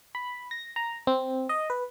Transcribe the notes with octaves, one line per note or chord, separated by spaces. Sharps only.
B5
A#6
A#5
C4
D#5
B4